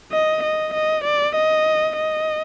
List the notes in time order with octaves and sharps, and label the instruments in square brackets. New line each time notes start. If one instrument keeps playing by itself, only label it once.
[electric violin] D#5
D#5
D#5
D5
D#5
D#5